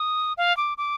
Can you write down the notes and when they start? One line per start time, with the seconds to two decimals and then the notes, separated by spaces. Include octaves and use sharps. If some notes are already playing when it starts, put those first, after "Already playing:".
Already playing: D#6
0.38 F5
0.57 D6
0.78 D6